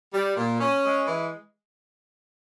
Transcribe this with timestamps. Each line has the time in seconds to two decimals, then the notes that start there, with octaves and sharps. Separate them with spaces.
0.13 G3
0.36 A#2
0.60 C#4
0.84 G#3
1.07 E3